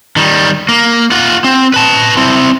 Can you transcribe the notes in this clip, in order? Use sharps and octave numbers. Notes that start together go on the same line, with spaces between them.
D#3 G3
A#3
F4 F#5
C4
B4 A5
C4 E4